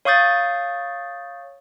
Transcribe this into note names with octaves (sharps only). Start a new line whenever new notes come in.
C#5 F5 C#6 D#6 G6 A6